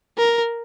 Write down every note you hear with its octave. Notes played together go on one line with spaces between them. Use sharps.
A#4